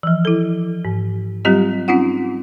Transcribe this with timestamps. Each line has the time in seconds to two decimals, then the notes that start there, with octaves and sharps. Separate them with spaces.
0.03 E3 F3
0.25 E4 A4
0.85 G#2
1.45 F#3 G3 C4 F4 G4 D#5
1.88 C4 C#4 D#4 F4 F#5